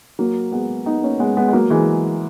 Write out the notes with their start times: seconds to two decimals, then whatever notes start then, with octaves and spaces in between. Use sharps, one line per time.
0.19 F#3 A#3
0.52 G#3 B3
0.86 B3 D#4
1.02 A#3 C#4
1.19 G#3 B3
1.37 G#3 B3
1.48 G#3
1.53 F#3 A#3
1.70 E3 G#3